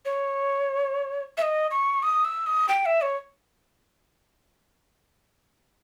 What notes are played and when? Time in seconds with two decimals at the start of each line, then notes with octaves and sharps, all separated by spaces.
0.05 C#5
1.38 E5
1.42 D#5
1.71 C#6
2.02 D#6
2.25 E6
2.46 D#6
2.68 G5
2.85 E5
3.01 C#5